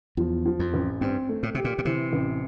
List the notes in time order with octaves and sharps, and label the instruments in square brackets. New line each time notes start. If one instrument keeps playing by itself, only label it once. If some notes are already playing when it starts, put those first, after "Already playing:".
[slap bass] E2 [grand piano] F3
[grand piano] F3
[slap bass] F2
[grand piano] A1
[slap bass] G2 [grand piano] C4
[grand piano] A3
[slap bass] A2
[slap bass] C3 [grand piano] G4
[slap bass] A#2
A#2
[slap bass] C3 [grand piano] E3
[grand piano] A1